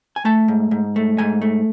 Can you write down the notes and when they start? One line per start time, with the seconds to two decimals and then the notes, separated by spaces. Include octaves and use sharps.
0.16 G#5
0.25 A3 A5
0.48 G#2
0.71 G#2
0.96 A3
1.18 G#2 G#5
1.42 A3